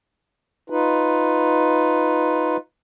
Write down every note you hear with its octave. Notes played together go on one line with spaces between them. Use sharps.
D#4 F4 B4